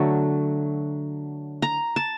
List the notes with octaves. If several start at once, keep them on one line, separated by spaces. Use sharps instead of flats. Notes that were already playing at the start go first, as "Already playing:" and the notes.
Already playing: D3 F#3 A3
A#5
A5